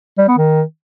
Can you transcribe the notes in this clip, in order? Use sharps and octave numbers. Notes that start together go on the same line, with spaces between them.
G3
B3
D#3